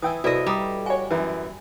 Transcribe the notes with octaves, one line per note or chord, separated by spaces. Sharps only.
E3 G5 G#5 D#6 E6
C2 E4 F#4 A4 B4 D5 D#5 D#6
G3 A#5 D#6
F#4 C#5 G#5
F#2 E3